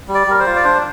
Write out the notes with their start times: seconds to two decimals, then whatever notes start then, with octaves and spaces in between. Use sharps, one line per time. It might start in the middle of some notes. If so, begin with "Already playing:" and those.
0.08 G3
0.15 D5
0.27 G3 A#4
0.40 C5
0.46 F4
0.55 D5
0.64 D4 C5